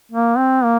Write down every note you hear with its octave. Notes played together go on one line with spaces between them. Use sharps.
A#3
C4
A#3